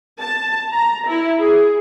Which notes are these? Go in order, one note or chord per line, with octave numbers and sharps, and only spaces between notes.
A5
A#5
E4
G#4